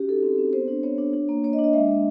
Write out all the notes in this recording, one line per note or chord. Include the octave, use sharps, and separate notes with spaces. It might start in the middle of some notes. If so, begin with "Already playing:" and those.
Already playing: C#4 F#4 G4
D#4 A4
C4
C4
B3 C5
D4
B3 C#5
D4
D4
A#3
A#3 C#5
D#5
D4
D#5
G#3 E5
G#3